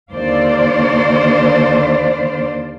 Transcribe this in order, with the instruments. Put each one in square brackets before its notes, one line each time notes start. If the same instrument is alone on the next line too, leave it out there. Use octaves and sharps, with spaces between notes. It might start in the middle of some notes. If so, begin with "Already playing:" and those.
[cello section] D#2 D3 C5 D5 F5